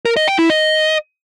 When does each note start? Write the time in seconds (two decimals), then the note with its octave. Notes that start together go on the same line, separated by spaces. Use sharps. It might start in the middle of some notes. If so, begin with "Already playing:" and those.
0.05 A#4
0.17 D#5
0.28 G5
0.39 E4
0.50 D#5